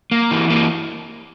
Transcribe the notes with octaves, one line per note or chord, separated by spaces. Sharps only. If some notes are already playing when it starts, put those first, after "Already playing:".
A#3
E3
A#3